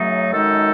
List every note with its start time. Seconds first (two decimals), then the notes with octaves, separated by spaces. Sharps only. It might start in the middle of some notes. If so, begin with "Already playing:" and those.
Already playing: F#2 C#3 F#3 A3 D#4
0.31 F#2 D#3 G#3 D#4 A4